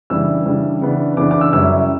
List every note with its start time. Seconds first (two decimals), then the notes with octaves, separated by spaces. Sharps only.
0.10 C#3 E3 G3 D4 E6
0.46 C#3 E3 G3 D4
0.81 C#3 E3 B3 D4
1.17 C#3 E3 B3 D4 D6
1.31 D6
1.41 E6
1.53 F#2 C#3 G3 C#4 E4 E6